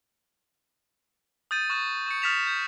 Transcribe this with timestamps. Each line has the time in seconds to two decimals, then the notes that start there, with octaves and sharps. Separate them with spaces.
1.51 D#6 G6 A6 D#7
1.70 C#6 D#6 F#6 D#7
2.06 C#6 D#6 C#7
2.22 D#6 F6 A6 B6 E7 F7
2.47 G6